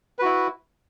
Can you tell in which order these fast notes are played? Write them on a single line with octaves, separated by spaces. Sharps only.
B4 F#4 E4